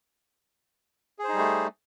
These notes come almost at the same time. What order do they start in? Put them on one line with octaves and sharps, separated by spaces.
G#4 C5 D#4 G3 A3